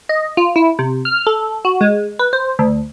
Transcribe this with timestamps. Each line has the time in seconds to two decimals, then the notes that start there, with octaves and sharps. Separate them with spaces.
0.09 D#5
0.37 F4
0.56 E4
0.79 C3
1.05 F6
1.27 A4
1.65 F#4
1.81 G#3
2.19 B4
2.33 C5
2.59 D2